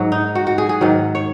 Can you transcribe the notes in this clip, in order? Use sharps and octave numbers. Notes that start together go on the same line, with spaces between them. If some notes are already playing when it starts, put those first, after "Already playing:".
Already playing: G#2 F#3 F#4 G#4
D#4
F#4
F#4
G#4
G#4
G#2 D#3 F#3
C#5